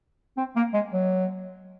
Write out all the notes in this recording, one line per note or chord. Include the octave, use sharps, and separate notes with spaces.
C4
A#3
G#3
F#3